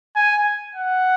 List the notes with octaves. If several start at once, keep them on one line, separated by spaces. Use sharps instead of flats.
G#5
F#5